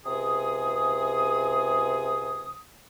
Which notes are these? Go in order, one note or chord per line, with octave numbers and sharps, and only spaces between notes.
C#2 C3 G#4 D#6